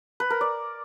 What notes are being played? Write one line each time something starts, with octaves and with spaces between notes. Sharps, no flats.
B4
A#4
D5